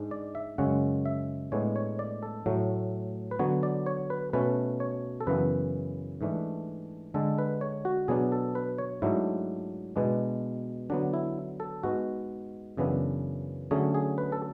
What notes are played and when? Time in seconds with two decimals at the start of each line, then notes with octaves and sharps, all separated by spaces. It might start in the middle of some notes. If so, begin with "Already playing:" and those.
Already playing: G#2 G#3 D4
0.11 D5
0.35 E5
0.58 F#2 C#3 G#3 C#4 F#5
1.06 E5
1.52 A2 G#3 B3 D4 C#5
1.76 C#5
1.99 D5
2.23 A4
2.46 A2 F#3 A3
3.31 B4
3.39 D3 F#3 B3 C#5
3.63 D5
3.86 C#5
4.10 B4
4.33 B2 A3 C#4 B4
4.80 C#5
5.21 A4
5.27 F#2 C#3 E3 B3 B4
6.21 G#2 E3 A3 D4
7.14 D3 G#3 D4 A4
7.38 B4
7.61 C#5
7.85 F#4
8.08 B2 F#3 B3 D4 G#4
8.32 A4
8.55 B4
8.78 C#5
9.02 G#2 F#3 A3 D4 E4
9.96 B2 G#3 B3 D4
10.90 D3 F#3 B3 D4
11.14 E4
11.60 A4
11.83 G#2 G#3 B3 F#4
12.77 F#2 C#3 E3 B3 D4
13.71 D3 F#3 A3 C#4 G#4
13.94 G#4
14.18 B4
14.32 A4